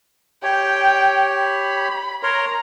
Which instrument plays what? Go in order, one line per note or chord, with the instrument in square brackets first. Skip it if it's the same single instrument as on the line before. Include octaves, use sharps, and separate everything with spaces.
[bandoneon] G4 C#5 [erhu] G5
[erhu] B5
[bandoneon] A#4 C#5 C6 [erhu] A#5